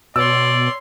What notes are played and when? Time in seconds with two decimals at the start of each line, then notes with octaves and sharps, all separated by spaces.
0.16 B2 C#5 D5 C6 E6